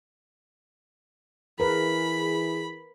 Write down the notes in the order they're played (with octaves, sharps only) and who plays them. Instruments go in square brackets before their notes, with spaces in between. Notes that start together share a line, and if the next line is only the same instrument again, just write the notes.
[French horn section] E3 G#4 [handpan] A#4 B4 [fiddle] B5